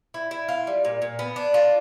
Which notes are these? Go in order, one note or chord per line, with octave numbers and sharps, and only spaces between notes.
E4
E4
F4
G3
A#2
A#2
B3
D4
F4